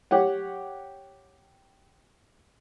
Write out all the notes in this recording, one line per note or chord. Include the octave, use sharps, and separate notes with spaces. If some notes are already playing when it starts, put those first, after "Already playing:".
G4 C#5 F#5